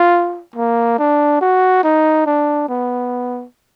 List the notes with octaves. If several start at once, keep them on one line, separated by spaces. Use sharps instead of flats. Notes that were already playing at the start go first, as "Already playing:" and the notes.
Already playing: F4
A#3
D4
F#4
D#4
D4
B3